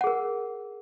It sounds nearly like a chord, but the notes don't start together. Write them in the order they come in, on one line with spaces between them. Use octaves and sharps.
F#5 G#4 A#4